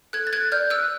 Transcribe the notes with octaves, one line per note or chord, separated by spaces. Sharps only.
A4 F#6 G#6
A6
F#6 G#6
D5 F6 G6
E6 F#6